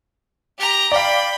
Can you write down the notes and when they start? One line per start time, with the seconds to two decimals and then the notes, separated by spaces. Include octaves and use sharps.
0.58 G4 A#5
0.92 D5 F5 G5 B5